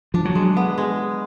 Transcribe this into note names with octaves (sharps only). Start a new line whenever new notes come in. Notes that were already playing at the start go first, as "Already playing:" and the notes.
F3 D4
F#3
G#3
B3
G#3